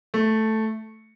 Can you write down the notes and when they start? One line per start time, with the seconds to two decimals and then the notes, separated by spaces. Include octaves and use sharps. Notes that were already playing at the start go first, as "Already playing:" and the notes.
0.14 A3